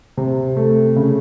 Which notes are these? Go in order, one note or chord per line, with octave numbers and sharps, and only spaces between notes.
C3
A3
C#3